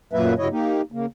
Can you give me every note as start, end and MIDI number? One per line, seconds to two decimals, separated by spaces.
0.13 0.34 42
0.13 0.34 46
0.13 0.34 54
0.13 0.34 58
0.13 0.34 71
0.13 0.34 76
0.38 0.48 43
0.38 0.48 49
0.38 0.48 54
0.38 0.48 64
0.38 0.48 73
0.38 0.48 75
0.51 0.82 58
0.51 0.82 63
0.51 0.82 67
0.92 1.06 49
0.92 1.06 58